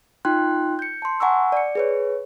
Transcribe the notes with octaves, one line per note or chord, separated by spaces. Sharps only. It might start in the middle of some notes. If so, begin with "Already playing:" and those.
D#4 F4 G5 C6 F#6
G6 C#7
A5 C6
F#5 G#5 A#5 C#6 E6
D5 C#7
G#4 B4 C#5